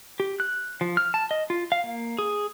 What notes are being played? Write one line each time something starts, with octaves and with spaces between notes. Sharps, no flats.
G4
F#6
F3
F6
A5
D#5
F4
F5
A#3
G#4